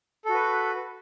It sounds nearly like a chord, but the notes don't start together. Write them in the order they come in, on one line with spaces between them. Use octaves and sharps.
A4 F#4 B4